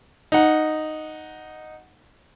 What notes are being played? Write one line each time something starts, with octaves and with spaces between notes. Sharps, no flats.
D#4 F#5